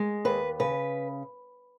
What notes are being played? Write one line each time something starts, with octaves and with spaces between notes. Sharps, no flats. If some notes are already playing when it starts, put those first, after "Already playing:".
Already playing: G#3
D#2 B4
C#3 B4